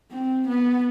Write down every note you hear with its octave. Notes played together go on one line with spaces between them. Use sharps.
C4
B3